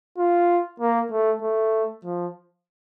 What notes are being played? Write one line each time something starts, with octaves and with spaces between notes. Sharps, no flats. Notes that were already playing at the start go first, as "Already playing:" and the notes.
F4
A#3
A3
A3
F3